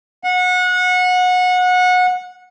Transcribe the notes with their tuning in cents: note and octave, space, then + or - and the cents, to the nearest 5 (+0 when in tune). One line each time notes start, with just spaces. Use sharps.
F#5 -25